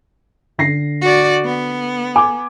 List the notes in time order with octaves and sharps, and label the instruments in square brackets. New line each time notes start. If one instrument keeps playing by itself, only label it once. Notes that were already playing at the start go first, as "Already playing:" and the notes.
[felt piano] D3 A#6 C7
[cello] F#4 D5
B3
[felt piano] G#5 D6